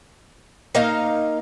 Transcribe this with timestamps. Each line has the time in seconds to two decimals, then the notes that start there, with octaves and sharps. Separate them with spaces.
0.75 A#3 D#4 F5